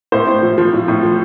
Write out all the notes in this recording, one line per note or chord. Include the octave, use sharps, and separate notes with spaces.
A2 C5
A2
F3
F3
A2
A2
F3